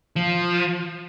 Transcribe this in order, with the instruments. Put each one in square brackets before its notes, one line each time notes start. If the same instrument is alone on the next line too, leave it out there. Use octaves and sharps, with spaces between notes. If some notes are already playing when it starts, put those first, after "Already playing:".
[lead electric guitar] F3